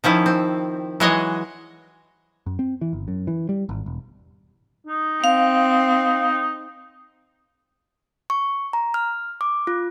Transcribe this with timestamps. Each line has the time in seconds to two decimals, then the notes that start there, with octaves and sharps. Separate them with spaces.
0.04 D#3 F3 C#4 E4
0.26 C4
1.00 E3 F#3 G#3 C#5 D#5
2.46 F#2
2.59 C4
2.81 E3
2.93 G1
3.08 F#2
3.27 E3
3.49 G3
3.69 G#1
3.86 E1
4.87 D#4
5.24 C4 F5
8.30 C#6
8.73 A#5
8.94 F6
9.41 D6
9.67 F4